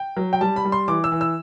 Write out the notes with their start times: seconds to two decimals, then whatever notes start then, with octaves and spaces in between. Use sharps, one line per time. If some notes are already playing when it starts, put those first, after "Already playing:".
Already playing: G5
0.17 F#3
0.33 G5
0.41 G3 A5
0.56 B5
0.65 G3
0.72 C6
0.88 E3 D6
1.04 E6
1.12 E3
1.21 E6